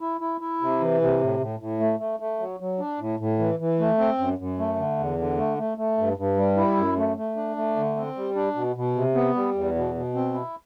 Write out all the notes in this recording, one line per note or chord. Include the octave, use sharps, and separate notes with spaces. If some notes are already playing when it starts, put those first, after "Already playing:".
E4
E4
E4
C3
E3
C3
A2
A2
A2
A3
A3
A3
F#3
F#3
D4
A2
A2
E3
E3
A3
C4
F#2
F#2
A3
D3
E2
D3
A3
A3
A3
G2
G2
G3
E4
F#2
A3
A3
D4
A3
D3
C4
G3
D4
B2
B2
C3
B3
G3
E2
B2
B2
C4
E4